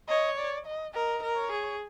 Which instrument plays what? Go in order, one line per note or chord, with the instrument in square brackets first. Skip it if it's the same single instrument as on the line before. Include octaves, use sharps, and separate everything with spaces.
[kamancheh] C#5 [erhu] D#5
[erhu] D5
D#5
[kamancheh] A#4 [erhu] D#5
[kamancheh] A#4
[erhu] C#5
[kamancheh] G#4